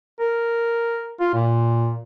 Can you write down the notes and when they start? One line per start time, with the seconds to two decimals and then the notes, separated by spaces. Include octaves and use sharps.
0.20 A#4
1.20 F4
1.34 A#2